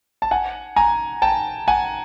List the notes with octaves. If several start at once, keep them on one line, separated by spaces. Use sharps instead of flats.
A5
F#5 G#5
G#5 A#5
G5 A5
F#5 G#5